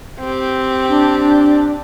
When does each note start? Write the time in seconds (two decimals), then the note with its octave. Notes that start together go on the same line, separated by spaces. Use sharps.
0.20 C4 G4
0.88 D4